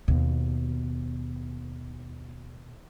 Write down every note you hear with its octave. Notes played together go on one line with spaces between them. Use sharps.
D#2 B2